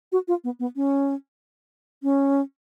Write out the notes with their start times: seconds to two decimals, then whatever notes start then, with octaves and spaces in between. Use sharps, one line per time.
0.12 F#4
0.28 F4
0.44 B3
0.60 B3
0.76 C#4
2.03 C#4